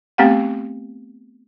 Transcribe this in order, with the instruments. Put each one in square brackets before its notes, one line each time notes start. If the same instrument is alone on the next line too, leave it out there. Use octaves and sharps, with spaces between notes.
[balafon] A3 B3 C4 G4 F5 F#5